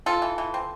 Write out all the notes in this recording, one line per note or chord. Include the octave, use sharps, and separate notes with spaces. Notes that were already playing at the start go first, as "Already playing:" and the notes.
C4 F4 A4
E3
E3
C4